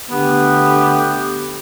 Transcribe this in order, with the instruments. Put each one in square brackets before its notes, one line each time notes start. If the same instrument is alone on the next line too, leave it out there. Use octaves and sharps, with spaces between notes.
[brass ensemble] D3 A3 G4 [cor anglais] B3